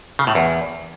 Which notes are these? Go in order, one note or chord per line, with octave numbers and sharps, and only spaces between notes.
C#3
A2
E2